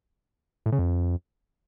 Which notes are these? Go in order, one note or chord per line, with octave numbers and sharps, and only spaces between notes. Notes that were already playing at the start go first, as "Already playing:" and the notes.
A2
C#3
F2